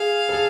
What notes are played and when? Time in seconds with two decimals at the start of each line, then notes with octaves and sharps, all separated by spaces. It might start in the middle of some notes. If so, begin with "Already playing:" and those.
Already playing: G#4 F5
0.29 A4
0.33 G#4